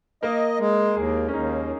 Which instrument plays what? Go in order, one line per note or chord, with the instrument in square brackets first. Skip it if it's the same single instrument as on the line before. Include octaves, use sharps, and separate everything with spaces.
[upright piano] A#3 A#4 [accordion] D#5
[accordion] G#3
[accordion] D#2 [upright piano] G#3 G#4
[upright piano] C#4
[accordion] D#2 [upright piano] D#4